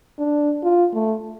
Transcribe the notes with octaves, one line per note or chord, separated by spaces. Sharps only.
D4
F4
A3